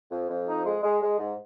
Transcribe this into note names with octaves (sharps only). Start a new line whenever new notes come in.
F2
F2
D#4
G#3
G#3
G#3
G#2